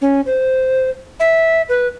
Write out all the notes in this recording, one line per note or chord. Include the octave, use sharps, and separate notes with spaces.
C#4
C5
E5
B4